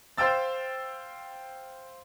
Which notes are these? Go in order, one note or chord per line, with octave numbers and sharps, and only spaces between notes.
C5 F5 G5 E6 A6